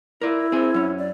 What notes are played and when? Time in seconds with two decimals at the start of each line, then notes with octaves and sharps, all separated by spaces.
0.21 E4 A#4 D5
0.52 C4 G#4
0.74 F#2 C#4
0.98 D5